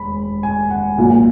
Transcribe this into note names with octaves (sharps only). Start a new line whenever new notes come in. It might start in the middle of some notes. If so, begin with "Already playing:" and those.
Already playing: E1 B5
G#5
F#5
B1 A#2 A#3